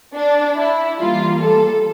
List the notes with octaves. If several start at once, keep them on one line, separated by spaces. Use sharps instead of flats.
D4
E4
E3 G3 A#3 F4
A4